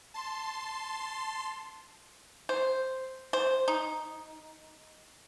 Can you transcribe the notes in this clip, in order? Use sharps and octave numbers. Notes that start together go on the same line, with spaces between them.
A5 C6
C5
C5
D#4